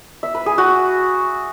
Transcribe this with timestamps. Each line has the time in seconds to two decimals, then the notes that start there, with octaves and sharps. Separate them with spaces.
0.23 E5
0.35 B4
0.46 G#4
0.58 F#4